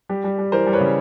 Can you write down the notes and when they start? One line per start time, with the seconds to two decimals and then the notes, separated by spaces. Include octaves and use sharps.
0.09 G3 G4
0.24 G3
0.38 G3
0.52 E3 A#4 C5
0.66 G3
0.73 B4 C#5
0.81 C#3